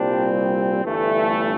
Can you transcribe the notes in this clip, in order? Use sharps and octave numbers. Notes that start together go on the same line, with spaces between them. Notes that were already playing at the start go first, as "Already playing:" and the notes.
Already playing: C2 A#2 G3 C4 D4
G1 G2 E3 A3